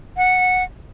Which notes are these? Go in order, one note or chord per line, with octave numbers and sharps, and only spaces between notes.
F#5